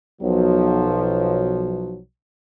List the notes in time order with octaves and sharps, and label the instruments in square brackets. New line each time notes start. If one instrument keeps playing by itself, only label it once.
[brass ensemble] B1 F3 F#3